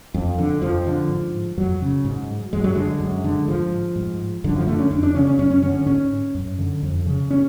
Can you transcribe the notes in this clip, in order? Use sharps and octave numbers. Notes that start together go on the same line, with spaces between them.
F2
D3
F2 F3
D3
G#2
F2 F#3
C#3
G#2
F#2 G#3
F#3
D3 G#3
F#2
D3
G#2 F3
G#2
F#2 D3
F3
D3 A3
C#4
F2 D4
D4
C#3 C#4
C#4
F#2 C#4
C#4
D3 C#4
C#4
G#2 C#4
F#2
D3
F2
C#3
C#4